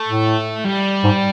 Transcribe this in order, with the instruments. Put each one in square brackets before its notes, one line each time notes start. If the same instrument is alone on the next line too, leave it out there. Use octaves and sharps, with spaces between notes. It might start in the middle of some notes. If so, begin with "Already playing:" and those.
Already playing: [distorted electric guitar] A3
[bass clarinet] A2
[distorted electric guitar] G3
[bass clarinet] G#2